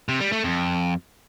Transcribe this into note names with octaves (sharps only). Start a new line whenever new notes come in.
C3
G3
A3
F2